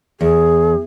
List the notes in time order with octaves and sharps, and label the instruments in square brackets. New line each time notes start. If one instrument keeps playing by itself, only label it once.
[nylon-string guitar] E2 [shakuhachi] G#4